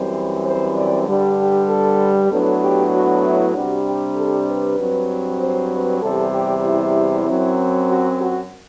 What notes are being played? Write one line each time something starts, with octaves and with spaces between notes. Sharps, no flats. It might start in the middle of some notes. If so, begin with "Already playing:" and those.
Already playing: F#2 E3 G3 C4 C5
C5
D5
G2 D3 G3
G4
A4
A2 F#3 B3 D4 A4
G4
F#4
E4
C3 G3 D4 F#4
G4
A4
B4
G2 F#3 C4
C5
B4
E2 C3 G3 A4
G4
E4
F#2 F#3 C4
F#4
F#4